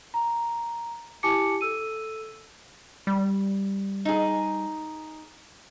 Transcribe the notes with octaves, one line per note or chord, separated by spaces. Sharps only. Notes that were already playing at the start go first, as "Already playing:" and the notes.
A#5
E4 G4 G#5 A5 D6 C#7
A4 E6 D#7
G3
D#4 G#4